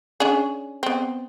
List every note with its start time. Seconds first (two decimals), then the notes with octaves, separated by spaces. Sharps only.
0.20 C#4 D4 G#4
0.83 B3 C4